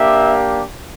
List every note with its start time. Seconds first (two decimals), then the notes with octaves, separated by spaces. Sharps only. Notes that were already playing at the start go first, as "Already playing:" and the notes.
Already playing: A#3 D4 G4 E5